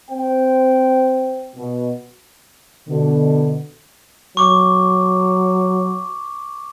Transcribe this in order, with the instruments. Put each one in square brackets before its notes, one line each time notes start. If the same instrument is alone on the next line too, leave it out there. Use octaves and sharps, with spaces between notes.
[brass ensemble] C4 C5 G5
B2
[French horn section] B2 D3
[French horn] F#3 [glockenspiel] C#6 D6